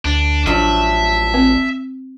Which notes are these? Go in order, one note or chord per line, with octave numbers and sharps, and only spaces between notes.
D2 D4
A1 F3 F#3 D4 E5
C4